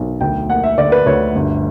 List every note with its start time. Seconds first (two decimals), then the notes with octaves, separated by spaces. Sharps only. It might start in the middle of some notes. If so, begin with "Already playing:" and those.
Already playing: B1
0.21 D2 G5
0.49 A#3 F#5
0.64 E5
0.78 D3 D5
0.92 B4
1.06 D2 C#5
1.35 G1